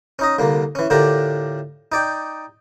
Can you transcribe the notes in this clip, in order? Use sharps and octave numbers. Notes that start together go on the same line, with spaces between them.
C#4 D#4 D#5
C2 D3 A#3
E3 C#4
A2 D3 D4 F4 G4 A#4
D#4 D5 G5